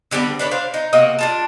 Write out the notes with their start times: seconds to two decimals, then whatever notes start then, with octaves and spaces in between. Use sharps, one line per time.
0.11 D3 G3 B3 C4
0.39 D4 B4 C#5
0.51 D4 C5 F5
0.74 D#4
0.93 C3 A#3 F#4 D#5
1.19 D4 F4 A5